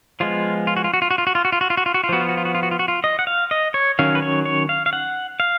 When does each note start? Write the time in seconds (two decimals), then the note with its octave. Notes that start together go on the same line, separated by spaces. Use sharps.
0.20 F3 G#3 B3 F4
0.67 F4
0.77 F#4
0.84 F4
0.94 F#4
1.02 F4
1.11 F#4
1.18 F4
1.27 F#4
1.35 F4
1.45 F#4
1.52 F4
1.61 F#4
1.70 F4
1.77 F#4
1.86 F4
1.94 F#4
2.04 F4
2.09 F3 B3 F#4
2.21 F4
2.29 F#4
2.37 F4
2.45 F#4
2.55 F4
2.63 F#4
2.71 F4
2.79 F#4
2.88 F4
3.04 D#5
3.19 F#5
3.27 F5
3.51 D#5
3.74 C#5
3.99 D#3 F#3 C#4 F5
4.15 B4
4.22 C#5
4.45 C#5
4.69 F5
4.86 F5
4.93 F#5
5.40 F5